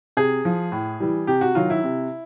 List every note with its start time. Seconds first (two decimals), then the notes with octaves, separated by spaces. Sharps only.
0.17 C3 G#4
0.45 F3
0.72 A2
1.00 E3 G3
1.27 C3 G4
1.41 F#4
1.55 D#3 F#3 F4
1.70 E4
1.84 C3